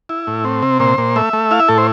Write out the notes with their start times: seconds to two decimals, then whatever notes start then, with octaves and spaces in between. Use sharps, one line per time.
0.09 E4
0.27 A2
0.45 C4
0.62 C3
0.80 A#2 C5
0.98 A#2
1.16 A3 E5
1.33 A3
1.51 E4 F5
1.60 E5
1.68 A2 A4
1.78 C5